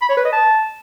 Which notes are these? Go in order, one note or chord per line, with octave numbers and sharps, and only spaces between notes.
B5
C#5
B4
D#5
A5